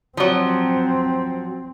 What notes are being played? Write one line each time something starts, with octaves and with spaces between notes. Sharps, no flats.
F3 F#3 C4